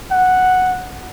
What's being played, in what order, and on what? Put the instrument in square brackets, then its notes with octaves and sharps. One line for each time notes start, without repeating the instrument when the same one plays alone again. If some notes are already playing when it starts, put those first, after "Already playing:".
[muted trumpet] F#5